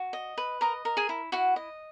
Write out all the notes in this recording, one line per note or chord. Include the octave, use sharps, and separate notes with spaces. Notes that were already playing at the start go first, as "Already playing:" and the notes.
Already playing: F#4
D#5
B4
A#4 D#5 A#5
A#4
G#4 G#5
E4
E4 F#4 F#5
D#5